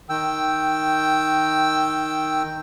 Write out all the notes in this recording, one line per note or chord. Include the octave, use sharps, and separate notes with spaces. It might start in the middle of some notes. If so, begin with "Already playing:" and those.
D#3 G5 E6